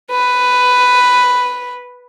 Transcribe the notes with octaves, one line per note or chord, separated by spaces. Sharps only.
B4